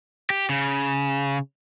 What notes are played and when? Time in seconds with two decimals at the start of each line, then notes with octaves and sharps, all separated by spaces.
0.30 G4
0.50 C#3